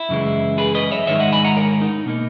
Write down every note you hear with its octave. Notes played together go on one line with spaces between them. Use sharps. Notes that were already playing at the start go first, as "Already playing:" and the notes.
Already playing: E4
F#2 C#3 E3 G#3
G#4 B4
B4 D#5
C#5 E5
G#2 D#3 G#3 D#4 C#5 E5
D#5 F#5
G#5 B5
F#5 A#5
A#4 C#5
D#4
B2 A#3 D#4